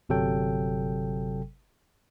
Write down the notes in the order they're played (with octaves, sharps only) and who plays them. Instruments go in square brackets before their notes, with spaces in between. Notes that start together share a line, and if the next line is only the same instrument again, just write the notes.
[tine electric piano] G1 C3 F#3 A4 G5